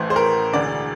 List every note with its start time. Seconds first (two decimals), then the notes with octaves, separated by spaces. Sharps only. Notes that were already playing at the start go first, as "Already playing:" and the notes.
Already playing: A1 A2 E3 A3 E4 C5
0.10 C5
0.16 A#4
0.53 E1 D2 D3 D5